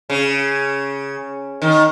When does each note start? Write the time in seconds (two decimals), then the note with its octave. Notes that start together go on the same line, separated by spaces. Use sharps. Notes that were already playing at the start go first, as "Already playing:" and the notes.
0.10 C#3
1.62 D#3